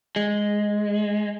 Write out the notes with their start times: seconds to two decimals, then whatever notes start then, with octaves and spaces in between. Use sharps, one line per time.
0.16 G#3